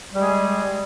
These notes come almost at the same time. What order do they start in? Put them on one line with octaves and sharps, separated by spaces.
G3 G#3 G#4